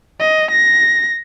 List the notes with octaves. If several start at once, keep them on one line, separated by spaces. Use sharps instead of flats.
D#5
A#6